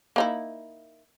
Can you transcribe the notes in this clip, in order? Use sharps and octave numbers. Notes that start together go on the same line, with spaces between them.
A#3 D#4 E4